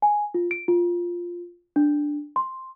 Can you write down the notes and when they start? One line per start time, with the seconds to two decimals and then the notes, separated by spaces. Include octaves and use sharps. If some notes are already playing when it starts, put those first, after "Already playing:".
0.02 G#5
0.34 F4
0.51 D7
0.68 F4
1.76 D4
2.36 C6